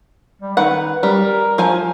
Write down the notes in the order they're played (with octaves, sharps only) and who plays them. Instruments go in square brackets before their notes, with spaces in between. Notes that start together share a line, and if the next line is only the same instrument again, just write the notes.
[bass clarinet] G3
[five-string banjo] D#3 F#5 [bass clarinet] B4
[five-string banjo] G3 [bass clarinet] A#4
[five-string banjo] F3 G#5